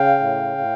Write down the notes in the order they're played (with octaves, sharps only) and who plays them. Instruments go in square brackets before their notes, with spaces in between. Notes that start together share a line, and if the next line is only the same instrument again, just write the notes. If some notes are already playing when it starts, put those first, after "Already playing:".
Already playing: [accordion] C#3 F5 G5
A2
A2